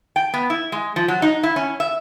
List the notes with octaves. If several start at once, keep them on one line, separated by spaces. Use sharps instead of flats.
G5
B3
E4
G#3
F3
F#3
D#4
E4
C#4
E5